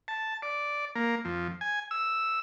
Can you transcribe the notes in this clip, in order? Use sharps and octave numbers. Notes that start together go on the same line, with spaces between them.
A5
D5
A#3
F2
G#5
E6